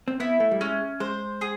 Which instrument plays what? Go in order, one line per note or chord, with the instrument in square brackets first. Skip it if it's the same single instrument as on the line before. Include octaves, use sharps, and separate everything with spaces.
[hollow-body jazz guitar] C4
[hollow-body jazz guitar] B3 [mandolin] E4
[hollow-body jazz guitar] A3
G3
[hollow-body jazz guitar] G#3 [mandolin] C#4
[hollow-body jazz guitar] G#3 [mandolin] C5
[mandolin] G#4